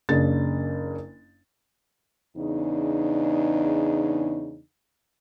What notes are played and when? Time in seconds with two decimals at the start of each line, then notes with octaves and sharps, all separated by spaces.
0.09 F#1 C#3 D4 A6
2.37 E2 C#3 D4 D#4